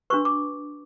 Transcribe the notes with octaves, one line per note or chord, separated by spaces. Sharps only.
D4 F#4 B4 C#6
D6